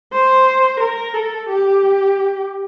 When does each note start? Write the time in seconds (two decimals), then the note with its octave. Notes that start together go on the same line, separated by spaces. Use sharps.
0.13 C5
0.80 A#4
1.14 A4
1.49 G4